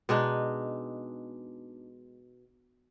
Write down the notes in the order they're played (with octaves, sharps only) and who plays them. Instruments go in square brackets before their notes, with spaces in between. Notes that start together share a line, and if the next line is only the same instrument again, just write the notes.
[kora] B2 G#3 D4 D#4